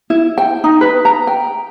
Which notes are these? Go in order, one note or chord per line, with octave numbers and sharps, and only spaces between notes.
E4
G5
D#4
B4
A#5
G5